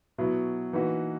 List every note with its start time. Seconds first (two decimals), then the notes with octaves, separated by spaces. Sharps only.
0.18 B2 F#3 B3 E4
0.73 E3 A#3 D#4 F#4 B4